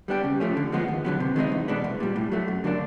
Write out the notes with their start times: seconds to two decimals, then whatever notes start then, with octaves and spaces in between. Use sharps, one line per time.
0.08 G3 B3 D4 G4
0.24 C#3
0.40 F3 A3 C#4
0.57 D3
0.72 F3 G#3 B3
0.88 D#2
1.05 D3 F#3 B3
1.20 C3
1.36 D#3 G#3 C4 D#4
1.52 E2
1.68 B2 G#3 B3 D4
1.84 C2
2.00 A#2 G3
2.16 A2
2.32 F#3 A3
2.48 F#2
2.64 D3 F#3 A#3 D4